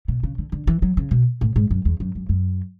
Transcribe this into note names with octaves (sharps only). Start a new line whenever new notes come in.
B2
C#3
D3
D3
E3
F#3
C#3
B2
A2
G#2
F#2
E2
F#2
F#2
F#2